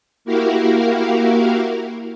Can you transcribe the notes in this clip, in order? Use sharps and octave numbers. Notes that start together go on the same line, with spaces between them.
A#3 E4 F#4 G4 A#4 F5